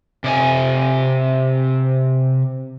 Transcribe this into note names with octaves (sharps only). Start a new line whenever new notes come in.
C3 D5 G#5